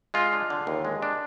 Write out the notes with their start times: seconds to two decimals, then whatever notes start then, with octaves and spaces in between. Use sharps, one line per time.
0.14 G#3 F4
0.32 D4
0.50 D3
0.67 D#2
0.85 G#3
1.02 D4